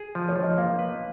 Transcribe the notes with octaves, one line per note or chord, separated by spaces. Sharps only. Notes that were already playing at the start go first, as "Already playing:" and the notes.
Already playing: G#4
F3
C#5
F3
D#5
A#3 F5
B4